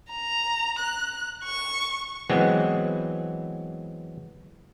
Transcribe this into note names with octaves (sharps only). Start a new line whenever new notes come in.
A#5
F#6
C#6
E3 F#3 G#3 B3 C4